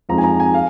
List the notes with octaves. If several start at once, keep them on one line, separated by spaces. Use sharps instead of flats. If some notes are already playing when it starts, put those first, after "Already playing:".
F2 F3 G#3 D#4 A#5
G#5
A#5
G#5
F5